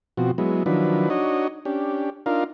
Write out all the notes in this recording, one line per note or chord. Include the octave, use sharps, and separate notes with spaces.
B2 F3 C4 F#4
F#3 G#3 B3 E4
D#3 F3 F#3 D4 E4 B4
D4 D#4 F#4 C#5 D#5
C#4 D4 G4
D4 D#4 F4 A#4 F5